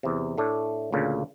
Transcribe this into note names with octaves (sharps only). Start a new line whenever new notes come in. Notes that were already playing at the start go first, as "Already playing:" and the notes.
E2 C3
A2 A3 D4
D2 A#2 C#3